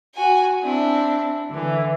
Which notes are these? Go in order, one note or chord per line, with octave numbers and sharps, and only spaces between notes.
F#4 G#5
C4 D4 E4
D3 E3